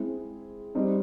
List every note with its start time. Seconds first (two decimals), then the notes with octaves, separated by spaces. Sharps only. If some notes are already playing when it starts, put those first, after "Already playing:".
Already playing: G#3 C4 E4 G#4
0.75 G3 C4 D#4